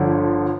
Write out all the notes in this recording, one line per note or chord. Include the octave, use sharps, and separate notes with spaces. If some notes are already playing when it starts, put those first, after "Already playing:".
Already playing: G1 D3 F3